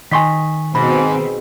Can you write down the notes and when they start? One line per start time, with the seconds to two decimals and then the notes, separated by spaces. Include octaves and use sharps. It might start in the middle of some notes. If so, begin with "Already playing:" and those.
0.11 D#3 D#5 G#5 C6 C#6 B6
0.75 G#2 B2 C4 B5